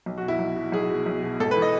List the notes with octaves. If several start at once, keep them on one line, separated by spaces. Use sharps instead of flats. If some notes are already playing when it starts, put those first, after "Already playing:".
B1
F#4
B2
E4
B1
B2
B1 G#4
B2
B1
B2
G#1 A4
B4
E3
D#5